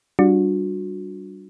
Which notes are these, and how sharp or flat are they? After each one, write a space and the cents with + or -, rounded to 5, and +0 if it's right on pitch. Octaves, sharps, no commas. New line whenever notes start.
G3 -15 D4 +0 F#4 -35